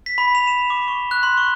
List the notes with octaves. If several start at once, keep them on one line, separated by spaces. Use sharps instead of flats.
B6
B5
F7
E7
D6
C#6
F#6
C6
C#6